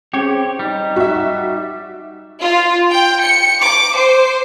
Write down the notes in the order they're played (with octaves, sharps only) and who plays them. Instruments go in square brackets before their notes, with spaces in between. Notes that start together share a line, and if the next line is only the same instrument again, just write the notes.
[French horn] C4 [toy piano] C#4 G#4 [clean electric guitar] G4 C#5
[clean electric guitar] G3 [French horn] D#4
[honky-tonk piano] F#4 E5
[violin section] F4
G5
C#7
D6
C5